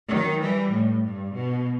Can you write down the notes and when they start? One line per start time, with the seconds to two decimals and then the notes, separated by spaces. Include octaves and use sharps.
0.09 D#3 F#3
0.41 E3 G3
0.71 A2
1.02 G2
1.34 B2